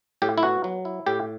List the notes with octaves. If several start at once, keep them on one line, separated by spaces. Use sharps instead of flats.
A2 G4
E4
B3 F#4
F#3
E4
A2 G4